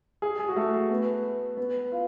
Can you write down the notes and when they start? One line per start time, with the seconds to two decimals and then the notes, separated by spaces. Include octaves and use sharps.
0.22 G#4
0.39 G#4
0.48 F#4
0.56 A3
0.90 B3
1.57 B3
1.92 F4